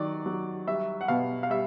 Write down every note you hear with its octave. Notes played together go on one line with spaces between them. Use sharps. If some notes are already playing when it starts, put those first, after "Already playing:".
Already playing: D#3 F#3 D5
F#3
G3 E5
F#5
B2 F5
F5
G3 E5